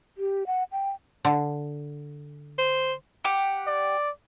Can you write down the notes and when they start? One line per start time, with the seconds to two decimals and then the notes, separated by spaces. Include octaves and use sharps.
0.18 G4
0.47 F#5
0.72 G5
1.25 D3
2.58 C5
3.24 G4 F#5
3.67 D5